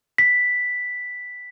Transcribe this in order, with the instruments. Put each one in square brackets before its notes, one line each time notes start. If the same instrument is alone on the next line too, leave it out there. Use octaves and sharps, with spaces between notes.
[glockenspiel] B6